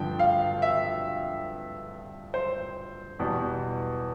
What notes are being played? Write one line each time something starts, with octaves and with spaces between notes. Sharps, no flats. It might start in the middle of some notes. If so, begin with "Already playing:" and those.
Already playing: G2 D3 F3 G5
F5
E5
C5
E2 B2 G3